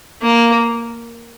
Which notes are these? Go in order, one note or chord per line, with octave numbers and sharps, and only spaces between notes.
A#3